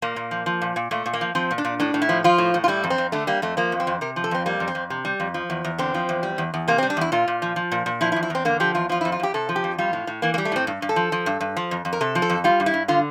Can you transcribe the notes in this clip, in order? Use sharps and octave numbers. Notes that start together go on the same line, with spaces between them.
A#2 A#3
A#2
F3
F3
A#2
A#2
A#2 A3
A#2
A#3
F3
F3 C4
A#2
D4
A#2
A2 D4
A2
E4
F3
F3 F4
A2
A2
F4
G3 E4
F2
C4
F2
D3 A3
G3 A#3
F2 A3
F3 A#3
F2
C4
F2
C3 A#4
F3
A4
F2 C4
G3 A#3
F2
C4
F2
C3
G3
F2
F3
E2
E2
D3 C4
F3
E2
G3
E2
E2
C3 A#3
C4
G3
D4
E2 E4
A#2 F4
A#2
F3
F3
A#2
A#2
F3 E4
E4
E2
E4
E2 C4
D3 A#3
F3 G4
E2 F4
F3 F4
E4
F2
F4
F2 G4
C3 A4
F3
G4
F2
G3 F4
A2
A2
E3 A#3
A#3
G3
A3
A2 C4
G2
G2
A4
F3
F3
G2
G2
F3
F2
F2
A#4
C3 A4
F3
A4
F2
G3 F4
G2
E4
G2
D3 F4